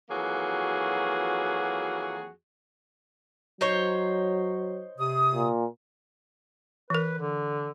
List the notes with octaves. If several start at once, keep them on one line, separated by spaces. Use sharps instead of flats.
F2 E3 F#3 A#3 F#4 G#4
F#3 D#4 C5 C#5
C3 D#6
A#2
E3 A#4 B4
D3